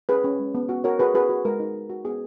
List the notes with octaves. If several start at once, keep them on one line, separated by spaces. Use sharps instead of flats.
C#4 G#4 B4
C#4
G#3
B3
F#4
F#4 A#4 C#5
F#4 G#4 B4
F#4 G#4 B4
F#4
G#3 A#4
D#4
D#4
F#4
B3 G#4